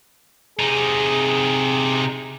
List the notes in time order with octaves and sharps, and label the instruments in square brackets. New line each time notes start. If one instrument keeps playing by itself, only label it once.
[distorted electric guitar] C3 D#4 [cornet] G#4